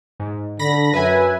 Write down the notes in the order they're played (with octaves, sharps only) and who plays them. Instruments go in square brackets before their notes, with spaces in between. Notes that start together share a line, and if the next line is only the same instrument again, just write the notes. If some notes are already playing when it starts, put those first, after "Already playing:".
[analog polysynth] G#2
[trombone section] D3 [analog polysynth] B5 A#6
[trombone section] F#2 [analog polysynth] B4 E5 G#5